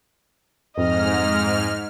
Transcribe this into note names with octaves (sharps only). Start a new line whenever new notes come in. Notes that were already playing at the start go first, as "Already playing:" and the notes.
F2 G#2 D#5 F6